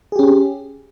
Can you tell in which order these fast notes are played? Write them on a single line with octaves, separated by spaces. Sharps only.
G#4 G4 C#4